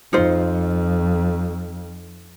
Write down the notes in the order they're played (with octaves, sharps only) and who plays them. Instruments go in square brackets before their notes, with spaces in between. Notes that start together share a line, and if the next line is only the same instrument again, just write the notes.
[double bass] F2 [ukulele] D#4 F4 C5